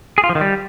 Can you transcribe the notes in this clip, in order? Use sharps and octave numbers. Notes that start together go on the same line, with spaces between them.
G#4
F4
F3
D#3
G3